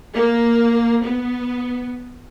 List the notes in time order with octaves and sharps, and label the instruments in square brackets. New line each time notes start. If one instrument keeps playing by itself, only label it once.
[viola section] A#3
B3